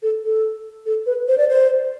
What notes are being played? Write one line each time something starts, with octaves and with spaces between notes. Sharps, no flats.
A4
A4
A4
B4
C5
D5
C5